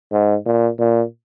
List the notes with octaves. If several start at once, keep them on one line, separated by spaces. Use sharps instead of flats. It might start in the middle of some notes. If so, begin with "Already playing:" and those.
G#2
A#2
A#2